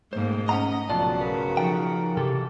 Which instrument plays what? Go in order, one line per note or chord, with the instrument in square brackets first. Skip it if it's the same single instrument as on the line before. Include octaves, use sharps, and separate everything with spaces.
[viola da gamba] G#2 A3 A#3 [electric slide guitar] B2 C5
[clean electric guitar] C#4 F#5 A#5 [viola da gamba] D#5
[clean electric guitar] B1 D5 [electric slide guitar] F2 B3 F4 [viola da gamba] C#3 F#4 [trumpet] A5
[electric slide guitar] G2 F#3 B4 [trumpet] A#4
[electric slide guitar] F3 D#4 A4 [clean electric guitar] G5
[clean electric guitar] C3 [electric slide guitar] E3 A4 [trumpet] G4